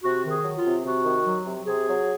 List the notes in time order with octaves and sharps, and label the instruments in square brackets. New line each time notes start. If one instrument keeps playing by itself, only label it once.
[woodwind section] C3 F#4
D#3
G#4
F#3
F4
C3
C3 F#4
D#3
F#3
C3
C3 G#4
F#3